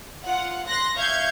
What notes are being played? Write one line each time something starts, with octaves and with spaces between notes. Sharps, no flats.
F4 F#5
C6 F#6 A#6
E5 F5 C#6 G6 G#6